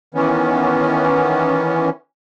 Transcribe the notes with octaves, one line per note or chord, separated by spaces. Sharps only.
D#3 E3 B3 C#4